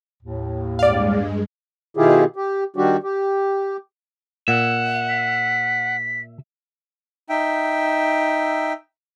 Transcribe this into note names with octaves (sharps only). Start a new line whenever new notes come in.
D#2 A2
G2 G#3 D5 F5
B2 D#3 E4 F4 G4 G#4
G4
D#3 G3 D4 F#4 G4
G4
A#2 E5 F#5
B6
D#4 E5 G5